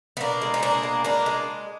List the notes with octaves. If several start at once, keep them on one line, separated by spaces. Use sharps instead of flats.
B3
B2 A#3 D4
G#3
D#4
B2 A#3 D4
G#3
B2 A#3 D4
G#3